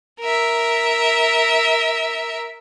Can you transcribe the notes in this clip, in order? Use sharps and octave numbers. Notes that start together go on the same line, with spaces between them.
A#4 E5